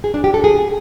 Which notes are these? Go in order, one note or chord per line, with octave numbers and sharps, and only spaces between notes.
G#4
D4
G4
A4
G#4